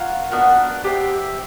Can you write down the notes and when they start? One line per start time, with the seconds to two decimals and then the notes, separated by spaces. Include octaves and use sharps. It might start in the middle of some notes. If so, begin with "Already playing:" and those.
Already playing: F4 A#4 C#5 F#5
0.31 B3 D4 F#4 A#4
0.84 G4 C5 E5 G5